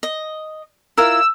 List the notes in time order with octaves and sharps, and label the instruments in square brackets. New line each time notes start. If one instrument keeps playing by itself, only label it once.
[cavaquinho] D#5
[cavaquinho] E4 F4 A#4 [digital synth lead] E6